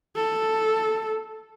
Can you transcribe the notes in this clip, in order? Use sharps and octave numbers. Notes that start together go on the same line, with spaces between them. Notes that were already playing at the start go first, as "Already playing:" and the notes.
A4